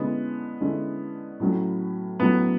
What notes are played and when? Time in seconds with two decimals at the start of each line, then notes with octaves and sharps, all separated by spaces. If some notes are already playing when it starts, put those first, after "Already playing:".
Already playing: D3 G#3 B3 C#4 E4
0.61 D3 G#3 C#4 E4
1.40 A2 F#3 C#4
2.20 A2 F#3 B3 C#4